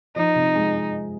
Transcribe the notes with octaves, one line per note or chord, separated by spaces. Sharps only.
F3 D#4
C3
G#3